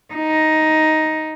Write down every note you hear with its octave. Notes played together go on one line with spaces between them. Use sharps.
D#4